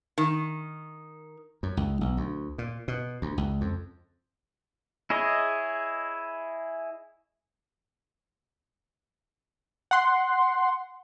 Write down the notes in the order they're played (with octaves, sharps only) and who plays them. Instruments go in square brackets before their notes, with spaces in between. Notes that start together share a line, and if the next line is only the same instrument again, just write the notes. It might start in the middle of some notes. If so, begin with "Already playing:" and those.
[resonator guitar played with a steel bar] D#3
[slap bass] F#2
C#2
B1
D2
A#2
B2
D2
C#2
F2
[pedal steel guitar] E4 G#4 C#5 D#5
[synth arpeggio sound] F#5 C6